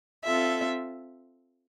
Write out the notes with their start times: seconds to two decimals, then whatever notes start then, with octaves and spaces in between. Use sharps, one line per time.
0.25 C4 F4 A4 E5